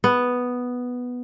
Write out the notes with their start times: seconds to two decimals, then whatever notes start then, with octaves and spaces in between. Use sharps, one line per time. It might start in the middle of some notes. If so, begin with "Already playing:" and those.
0.04 B3